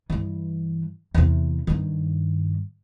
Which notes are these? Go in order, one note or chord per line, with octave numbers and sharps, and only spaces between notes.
G2 E3
E2 C3
G2 D#3